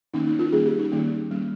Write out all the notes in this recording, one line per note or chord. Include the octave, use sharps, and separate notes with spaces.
D#3 A#3 C#4 D#4
D#4
F4
D#3 G3 A#3 C#4 G#4
G4
D#4
D#3 G3 A#3 C#4
G3 A#3 C#4